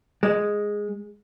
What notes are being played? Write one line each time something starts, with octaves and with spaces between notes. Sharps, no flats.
G#3